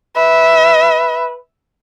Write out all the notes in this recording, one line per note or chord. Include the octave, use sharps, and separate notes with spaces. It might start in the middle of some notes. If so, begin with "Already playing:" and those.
B4 E5